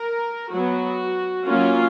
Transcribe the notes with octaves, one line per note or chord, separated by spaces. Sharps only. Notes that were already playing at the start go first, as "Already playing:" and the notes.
Already playing: A#4
F#3 B3 F#4
F#3 A#3 C#4 F4